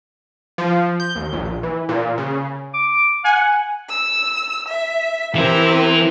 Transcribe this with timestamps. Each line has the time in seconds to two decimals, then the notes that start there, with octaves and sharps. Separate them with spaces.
0.58 F3
1.00 G6
1.15 D#2
1.33 A#1
1.63 E3
1.89 A#2
2.18 C#3
2.74 D6
3.24 F#5 G#5
3.89 E6
4.69 E5
5.35 E3 C4 E4 G4 A#4